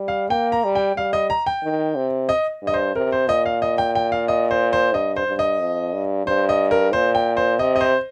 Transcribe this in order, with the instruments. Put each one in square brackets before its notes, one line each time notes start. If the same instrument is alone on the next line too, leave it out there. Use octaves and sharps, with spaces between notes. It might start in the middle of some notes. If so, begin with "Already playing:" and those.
Already playing: [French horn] G3
[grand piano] F5
[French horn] A#3 [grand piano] G5
[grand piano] A#5
[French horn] G3
[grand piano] G5
[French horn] G3 [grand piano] F5
[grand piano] D#5
A#5
G5
[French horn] D#3
C3
[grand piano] D#5
[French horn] G2 [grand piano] D#5
[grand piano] C5
[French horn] C3 [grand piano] A#4
[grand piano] C5
[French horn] A#2 [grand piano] D#5
[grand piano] F5
D#5
G5
G5
F5
D#5
C5
C5
[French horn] G2 [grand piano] D#5
[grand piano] C5
[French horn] G2
[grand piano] D#5
[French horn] F2
G2
[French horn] G2 [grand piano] C5
[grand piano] D#5
A#4
[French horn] A#2 [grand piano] C5
[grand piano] G5
C5
[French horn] C3 [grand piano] D#5
[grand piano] D#5
C5